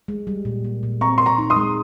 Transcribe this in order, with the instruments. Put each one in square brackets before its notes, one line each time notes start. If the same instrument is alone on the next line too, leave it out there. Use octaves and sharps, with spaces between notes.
[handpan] G#3
G3
A#2
A#3
A#2
[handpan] C4 [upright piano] A#5 C#6
[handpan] A#4 [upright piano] C6
[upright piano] A#5 C#6
[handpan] D#4
[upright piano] C6 D#6
[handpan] G#3